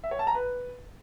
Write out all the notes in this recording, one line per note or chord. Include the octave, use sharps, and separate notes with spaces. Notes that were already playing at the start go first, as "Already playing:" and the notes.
E5
C#5
A5
A#5
B4